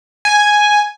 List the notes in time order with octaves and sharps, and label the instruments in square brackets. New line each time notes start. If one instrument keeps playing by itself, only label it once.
[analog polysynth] G#5